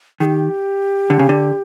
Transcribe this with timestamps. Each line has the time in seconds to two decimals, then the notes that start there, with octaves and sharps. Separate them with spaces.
0.20 D#3 G#4
0.25 G4
1.10 D3
1.19 C#3
1.29 D3